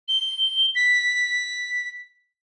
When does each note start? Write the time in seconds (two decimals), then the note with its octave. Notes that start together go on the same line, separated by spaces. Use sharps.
0.08 G7
0.75 B6